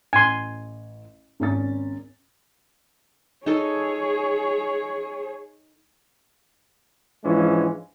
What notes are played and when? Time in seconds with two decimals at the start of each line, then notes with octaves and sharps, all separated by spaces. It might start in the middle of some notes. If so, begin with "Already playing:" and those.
0.13 A1 G#5 C6
1.40 G#1 C#4 A6
3.46 D#4 G#4 A4 C#5
7.24 G#2 E3 F3 G#3 C#4 D4